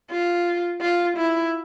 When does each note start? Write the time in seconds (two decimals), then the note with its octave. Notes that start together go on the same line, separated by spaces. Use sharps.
0.11 F4
0.81 F4
1.17 E4